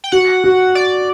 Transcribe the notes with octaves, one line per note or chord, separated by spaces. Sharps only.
G5
F#4 F#5
F#4
D5